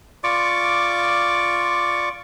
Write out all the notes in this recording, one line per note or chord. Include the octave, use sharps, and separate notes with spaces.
F4 D5 C#6 D6